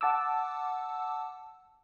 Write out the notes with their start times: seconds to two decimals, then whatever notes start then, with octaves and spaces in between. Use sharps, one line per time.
0.01 F#5 A5 D6 E6